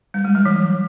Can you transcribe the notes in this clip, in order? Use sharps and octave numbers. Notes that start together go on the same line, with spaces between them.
G3
G#3
F#3
E3